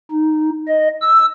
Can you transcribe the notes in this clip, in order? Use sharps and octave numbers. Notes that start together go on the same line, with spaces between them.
D#4
D#5
E6